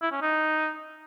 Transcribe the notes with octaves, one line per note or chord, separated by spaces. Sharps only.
E4
C#4
D#4